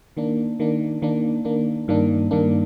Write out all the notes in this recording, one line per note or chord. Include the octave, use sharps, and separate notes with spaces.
D#3 A#3 D4
D#3 A#3 D4
D#3 A#3 D4
D#3 A#3 D4
G2 D#3 A#3 D4
G2 D#3 A#3 D4